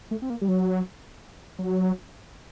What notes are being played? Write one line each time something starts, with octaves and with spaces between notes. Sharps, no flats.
A3
C4
A#3
G3
F#3
F#3